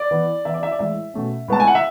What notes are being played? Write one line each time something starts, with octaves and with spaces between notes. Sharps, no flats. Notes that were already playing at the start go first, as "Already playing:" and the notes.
Already playing: D5
E3 B3
E3 B3 E5
D5
E5
D5
A2 E3 G#3 E5
B2 A3 C#4
A2 G#3 B3 A5
G#5
F#5
E5